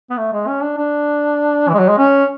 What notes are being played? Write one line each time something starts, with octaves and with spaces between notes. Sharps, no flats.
B3
A3
G#3
C#4
D4
D4
E3
G#3
F#3
G#3
C#4